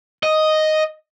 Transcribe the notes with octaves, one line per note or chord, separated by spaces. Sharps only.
D#5